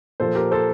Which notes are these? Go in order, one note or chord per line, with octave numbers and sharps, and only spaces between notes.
A#2 F3 A4 C5
G4 A#4
A4 C5